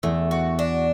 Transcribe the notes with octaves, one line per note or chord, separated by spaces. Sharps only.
E2 A3
F#4
D4